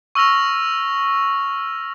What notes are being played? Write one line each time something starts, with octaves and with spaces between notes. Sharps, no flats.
C#6 E6 F6 A#6 F7